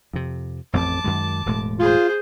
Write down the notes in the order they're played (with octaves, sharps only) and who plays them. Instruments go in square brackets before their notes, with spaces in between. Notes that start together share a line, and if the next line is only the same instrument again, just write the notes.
[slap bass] F2 C3
[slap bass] A1 F2 C4 [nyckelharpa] A5 D6
[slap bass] F#2 D#3 G#3
E1 A2 G#3
[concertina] F4 [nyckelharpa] G#4 C5